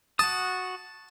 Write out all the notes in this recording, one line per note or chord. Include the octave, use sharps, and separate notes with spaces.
F#4 A5 D#6